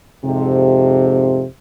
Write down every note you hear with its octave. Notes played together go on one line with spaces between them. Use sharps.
F2 G#2 C3